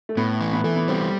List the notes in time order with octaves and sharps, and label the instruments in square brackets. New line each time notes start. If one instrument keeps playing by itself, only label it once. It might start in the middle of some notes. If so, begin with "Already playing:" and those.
[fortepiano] A3
[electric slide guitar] A2 [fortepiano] B3
[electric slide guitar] E3
[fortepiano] B3
[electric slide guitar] E3 [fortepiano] A3
[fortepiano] B3
[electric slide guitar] G3 [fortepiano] C4